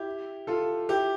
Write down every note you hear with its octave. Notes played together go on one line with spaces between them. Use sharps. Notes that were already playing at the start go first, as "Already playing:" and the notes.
Already playing: E4 G4
F4 A4
E4 G4